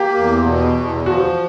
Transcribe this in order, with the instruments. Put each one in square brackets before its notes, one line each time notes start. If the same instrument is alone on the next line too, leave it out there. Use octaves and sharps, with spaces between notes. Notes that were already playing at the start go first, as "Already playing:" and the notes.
Already playing: [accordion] A#3 [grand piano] G4
[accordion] E2
B2
E2
[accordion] F3 [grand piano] F#4